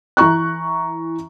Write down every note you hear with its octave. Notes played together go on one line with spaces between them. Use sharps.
E3 A#5 C#6 F#6